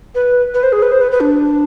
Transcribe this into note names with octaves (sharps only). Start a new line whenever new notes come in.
B4
B4
C5
G#4
B4
C5
B4
B4
D4